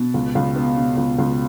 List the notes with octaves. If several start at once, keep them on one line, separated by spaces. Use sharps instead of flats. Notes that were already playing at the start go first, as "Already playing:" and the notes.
Already playing: B2
C#2
C#2
B3
B2
C#2
C#2